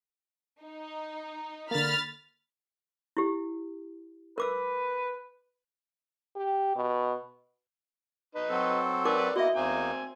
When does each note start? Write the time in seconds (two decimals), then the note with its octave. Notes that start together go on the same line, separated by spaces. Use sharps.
0.63 D#4
1.71 D3 A#3 B5 F6 A6
3.17 E4 G4
4.38 A#4 B4 D6 E6
6.36 G4
6.76 B2
8.35 D#4 B4
8.50 F#3 C4 A4
9.05 D#4 A#4 B4 D5 D6
9.36 A#3 B3 E4 F#4 D#5 E5
9.54 E2 A#3 C4 D#4 G#5